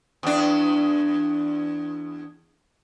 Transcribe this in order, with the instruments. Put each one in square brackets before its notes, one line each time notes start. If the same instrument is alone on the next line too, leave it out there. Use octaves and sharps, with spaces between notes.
[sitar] E2 D4